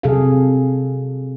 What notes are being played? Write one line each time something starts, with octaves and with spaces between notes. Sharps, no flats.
C3 F#3 C4 G#4 A4 F5